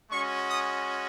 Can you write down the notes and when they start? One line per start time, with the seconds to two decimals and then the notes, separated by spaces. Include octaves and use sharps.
0.11 G#3 C#4 F#4 C#6
0.48 D#6